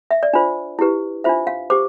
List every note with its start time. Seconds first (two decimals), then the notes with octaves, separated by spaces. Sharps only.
0.11 E5
0.23 D5
0.33 D4 F4 C5
0.79 E4 G4 B4
1.24 D4 F4 C5 E5
1.47 F5
1.70 G4 C5 D6